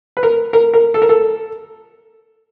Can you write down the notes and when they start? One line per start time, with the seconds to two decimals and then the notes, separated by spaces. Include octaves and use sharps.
0.17 B4
0.23 A#4
0.53 A#4
0.74 A#4
0.94 A4
1.02 A#4
1.09 A4